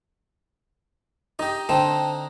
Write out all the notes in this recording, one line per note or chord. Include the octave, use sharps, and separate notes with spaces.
D#4 G4 D#5
D3 C4 D#4 C5 G5 A5 E7